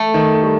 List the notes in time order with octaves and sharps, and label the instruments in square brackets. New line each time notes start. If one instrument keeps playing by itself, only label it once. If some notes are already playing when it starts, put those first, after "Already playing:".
Already playing: [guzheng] A3
[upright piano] D#3
G3